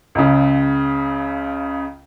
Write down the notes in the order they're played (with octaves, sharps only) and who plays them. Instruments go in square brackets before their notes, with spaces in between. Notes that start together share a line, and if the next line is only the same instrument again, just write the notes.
[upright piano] C#2 C#3